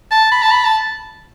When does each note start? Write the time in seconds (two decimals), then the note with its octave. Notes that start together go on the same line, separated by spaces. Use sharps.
0.11 A5
0.31 B5
0.42 A5
0.51 B5
0.65 A5